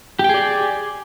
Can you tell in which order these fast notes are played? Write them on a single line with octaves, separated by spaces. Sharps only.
G4 G5 G#4 D5